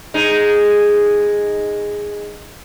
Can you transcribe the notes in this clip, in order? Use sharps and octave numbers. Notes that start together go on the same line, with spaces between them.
G#3 D#4